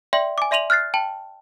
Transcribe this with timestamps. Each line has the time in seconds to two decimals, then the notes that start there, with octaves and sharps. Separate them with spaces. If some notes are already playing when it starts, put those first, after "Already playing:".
0.13 D5 E5 G5 C6 F#7
0.38 G#5 D6
0.51 D5 E5 C6 D#7 F7 F#7
0.70 F6 F#6 A6 C7
0.94 G5 A5 F#7